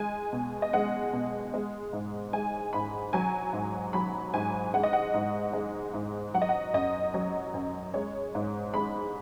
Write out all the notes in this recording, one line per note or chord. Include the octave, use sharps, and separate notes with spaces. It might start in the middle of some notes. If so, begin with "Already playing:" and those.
Already playing: G#3 G#5
B2
D#5
G#3 F#5
B2
G#3
G#2
G#3 G#5
G#2 B5
F#3 G#5
G#2
F#3 B5
G#2 G#5
G#3 F#5
D#5
F#5
G#2
G#3
G#2
F#3 F#5
D#5
F#5
F#2 D#5
F#3
F#2
G#3 C#5
G#2
G#3 B5